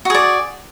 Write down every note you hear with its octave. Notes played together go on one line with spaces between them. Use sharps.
F#4 G#4 D5